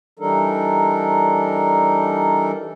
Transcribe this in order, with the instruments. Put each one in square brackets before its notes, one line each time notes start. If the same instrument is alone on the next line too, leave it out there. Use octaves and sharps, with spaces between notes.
[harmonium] E3 G3 D4 D#4 A4 A#4